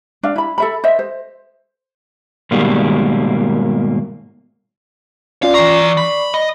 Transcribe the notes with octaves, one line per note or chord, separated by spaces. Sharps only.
D4 F5
E4 B5
A4 E5 B5
C5 D#5 E5
C5
G#2 B2 D#3 G3 A#3
C#4 F4 D5 F5
E3 D5 A#5 C#6 C7
B5
D#5